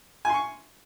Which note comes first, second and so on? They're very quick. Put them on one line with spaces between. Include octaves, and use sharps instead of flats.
G#5 C6 C#6